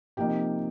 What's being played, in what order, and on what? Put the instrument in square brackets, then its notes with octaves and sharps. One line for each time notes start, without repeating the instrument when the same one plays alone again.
[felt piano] C3 F3 A#3 D#4 G4 G5